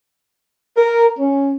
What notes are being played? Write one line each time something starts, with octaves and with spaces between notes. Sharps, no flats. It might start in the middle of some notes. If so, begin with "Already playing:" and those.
A#4
C#4